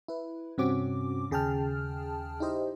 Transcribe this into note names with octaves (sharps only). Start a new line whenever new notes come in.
E4 B4
G2 C3 C4 C#4 F#4 D6
D#2 C#3 G#4 G5 A5 F6
D#4 E4 G4 C5 D#5